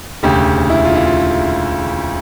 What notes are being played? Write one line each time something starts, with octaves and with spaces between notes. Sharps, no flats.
E1 D2 C#3 G4
E4
F4
E4
F4